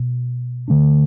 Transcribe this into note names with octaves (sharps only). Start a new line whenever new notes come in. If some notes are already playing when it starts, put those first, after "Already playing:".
Already playing: B2
D3 A3 D4